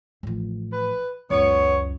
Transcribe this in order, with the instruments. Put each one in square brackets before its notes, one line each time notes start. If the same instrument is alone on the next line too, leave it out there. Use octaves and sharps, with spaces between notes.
[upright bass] A1 F3
[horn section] B4
[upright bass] C#2 F#2 [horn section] B3 C#5